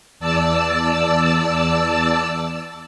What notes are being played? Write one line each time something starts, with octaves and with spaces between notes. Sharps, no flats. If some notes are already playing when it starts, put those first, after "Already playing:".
E2 D5 A5 E6